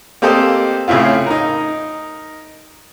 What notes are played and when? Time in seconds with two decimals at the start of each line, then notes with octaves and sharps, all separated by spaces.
0.22 A#3 C4 G4 A4 C5 D#5
0.88 A2 C#3 C4 E4 F4
1.26 D#4 A#4